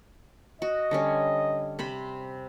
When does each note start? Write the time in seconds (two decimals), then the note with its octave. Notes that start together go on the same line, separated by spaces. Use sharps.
0.62 F#4 D#5
0.91 D3 G3 C#4
1.79 C3 C5 B5